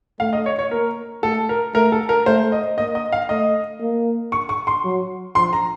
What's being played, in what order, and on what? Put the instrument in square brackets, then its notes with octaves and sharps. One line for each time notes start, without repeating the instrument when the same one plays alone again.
[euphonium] A3 [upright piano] F5
[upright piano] D#5
C#5
C#5
[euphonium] A#3 [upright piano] A#4
[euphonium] A3 [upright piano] A4
[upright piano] A#4
[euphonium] A3 [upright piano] A#4
[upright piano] A4
A#4
[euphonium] A3 [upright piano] C5
[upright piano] D#5
[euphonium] A#3 [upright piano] D#5
[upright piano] D#5
F5
[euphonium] A3 [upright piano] D#5
[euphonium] A#3
[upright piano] C#6
C#6
C6
[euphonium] F#3
[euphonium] F3 [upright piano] C6
[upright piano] A#5